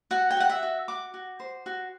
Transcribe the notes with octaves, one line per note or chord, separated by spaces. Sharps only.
F#4 F#5
G5
F#4 F#5
E5
F#4
F#4 D6
F#4
C5
F#4